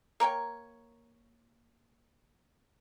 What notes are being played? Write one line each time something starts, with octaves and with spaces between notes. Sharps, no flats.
A#3 A#4 C#5 G5